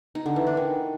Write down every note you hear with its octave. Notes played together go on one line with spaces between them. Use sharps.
D#4
D3
E3
D4
D#3